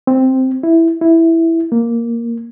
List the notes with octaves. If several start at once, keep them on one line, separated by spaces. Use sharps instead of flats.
C4
E4
E4
A#3